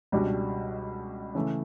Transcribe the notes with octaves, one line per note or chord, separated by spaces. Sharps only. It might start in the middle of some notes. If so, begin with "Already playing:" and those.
C#2 B2 G3 D4 F#4
C#3 E3 A3